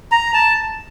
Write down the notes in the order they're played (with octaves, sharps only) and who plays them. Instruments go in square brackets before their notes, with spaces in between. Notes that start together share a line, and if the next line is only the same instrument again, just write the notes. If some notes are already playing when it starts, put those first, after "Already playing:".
[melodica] A#5
A5